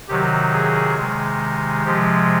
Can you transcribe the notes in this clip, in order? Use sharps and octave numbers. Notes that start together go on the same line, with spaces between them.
C3 D#3 F#3 G4
G#4
C3 D#3 G#3
C3 F3 G#3 G4